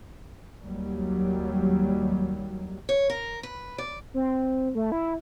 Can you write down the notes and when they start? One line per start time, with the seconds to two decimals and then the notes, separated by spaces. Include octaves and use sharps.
0.62 D#2 F#3 G3
2.89 C#5
3.10 A#4
3.43 B4
3.78 D5
4.14 C4
4.75 A3
4.92 E4